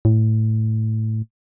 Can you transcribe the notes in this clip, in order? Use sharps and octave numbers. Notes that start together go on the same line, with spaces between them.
A2